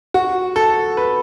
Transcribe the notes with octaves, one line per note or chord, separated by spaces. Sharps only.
F#4
A4
B4